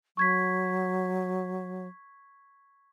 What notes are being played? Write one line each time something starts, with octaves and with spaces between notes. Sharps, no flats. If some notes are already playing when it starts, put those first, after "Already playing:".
F#3 C#6 G#6 B6